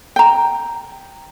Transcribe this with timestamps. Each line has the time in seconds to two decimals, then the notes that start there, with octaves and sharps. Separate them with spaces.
0.16 G5 A#5